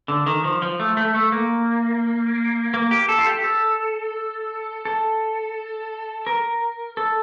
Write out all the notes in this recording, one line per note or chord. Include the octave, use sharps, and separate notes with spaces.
D3
D#3
F3
F3
A3
A3
A3
A#3
A#3
G4
A4
F4
G4
A4
A4
A#4
A4